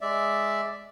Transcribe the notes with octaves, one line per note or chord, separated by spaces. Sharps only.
G#3 D5 E5